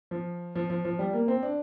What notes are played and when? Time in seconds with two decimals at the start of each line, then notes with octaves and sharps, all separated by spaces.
0.11 F3
0.55 F3
0.70 F3
0.85 F3
0.99 G3
1.13 A#3
1.28 C4
1.43 D4